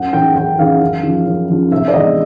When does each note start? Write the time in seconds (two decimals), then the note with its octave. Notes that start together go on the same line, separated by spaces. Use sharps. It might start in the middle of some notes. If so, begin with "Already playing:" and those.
Already playing: F#2 F#5
0.13 C#3 E3 G5
0.35 F#2 G5
0.58 C#3 E3 F5
0.81 F#2
1.03 C#3 F3
1.26 F#2
1.49 C#3 F3
1.71 C3 E5
1.88 D5
1.94 E3 G#3 B3 D4 D#5